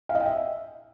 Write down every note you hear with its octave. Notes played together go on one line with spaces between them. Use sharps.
F5
D#5
G5
E5